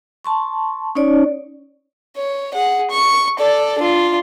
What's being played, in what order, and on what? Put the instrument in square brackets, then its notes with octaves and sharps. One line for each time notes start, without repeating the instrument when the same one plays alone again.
[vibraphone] A5 C6 C#6
C#4 D#4 C#5 D5
[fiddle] C#5
G#4 F#5
C#6
A4 D5
D4 F4